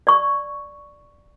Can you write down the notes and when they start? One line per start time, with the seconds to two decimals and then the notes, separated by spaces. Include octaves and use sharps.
0.07 D5 C#6